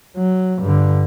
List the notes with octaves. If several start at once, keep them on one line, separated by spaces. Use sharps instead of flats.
F#3
G2 D3